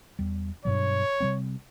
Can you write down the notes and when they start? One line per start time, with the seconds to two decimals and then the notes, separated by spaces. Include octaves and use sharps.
0.19 E2 G3
0.65 G2 B2 F#3 C#5
1.20 C3 G3 C4